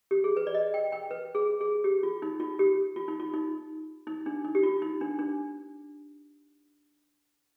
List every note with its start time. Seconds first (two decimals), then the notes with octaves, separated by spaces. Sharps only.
0.11 G4
0.24 G#4
0.37 B4
0.47 D5
0.54 D#5
0.74 G5
0.92 G5
1.11 B4
1.35 G#4
1.61 G#4
1.84 G4
2.03 F4
2.22 D#4
2.40 F4
2.59 G4
2.96 F4
3.08 D#4
3.20 F4
3.34 D#4
4.07 D#4
4.26 D4
4.45 D#4
4.55 G4
4.63 F4
4.82 D#4
5.01 D4
5.19 D4